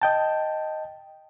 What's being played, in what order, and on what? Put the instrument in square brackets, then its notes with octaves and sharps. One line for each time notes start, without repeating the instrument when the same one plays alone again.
[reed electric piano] D#5 G5 A5